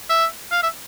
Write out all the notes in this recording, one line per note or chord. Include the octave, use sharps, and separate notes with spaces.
E5
F5
E5